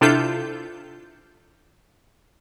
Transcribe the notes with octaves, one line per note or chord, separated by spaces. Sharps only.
C3 D4 E4 F4 A4 G6